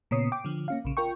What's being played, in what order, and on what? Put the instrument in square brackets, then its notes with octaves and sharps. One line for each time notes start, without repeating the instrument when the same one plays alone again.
[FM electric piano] A#2 C#3 B3 C#5 D#6 C7
G5 D6
D3 F3
A#3 C#4 F5
A#1 C#3
F4 A#4 G5 C#6